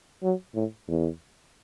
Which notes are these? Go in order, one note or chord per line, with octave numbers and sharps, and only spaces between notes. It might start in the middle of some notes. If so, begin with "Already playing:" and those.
F#3
A2
E2